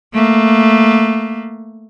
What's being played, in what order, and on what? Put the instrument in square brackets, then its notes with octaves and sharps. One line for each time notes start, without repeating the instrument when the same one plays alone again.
[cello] A3 A#3